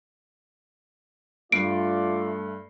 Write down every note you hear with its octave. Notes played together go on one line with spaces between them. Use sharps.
G2 A3 F4 D5 C7 D7